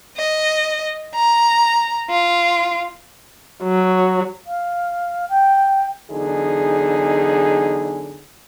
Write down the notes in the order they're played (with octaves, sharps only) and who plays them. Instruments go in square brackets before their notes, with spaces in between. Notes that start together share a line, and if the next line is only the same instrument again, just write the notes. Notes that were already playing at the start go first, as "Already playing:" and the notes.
[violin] D#5
A#5
F4
[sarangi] F#3
[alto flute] F5
G5
[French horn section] E2 D3 F#3 D#4 G#4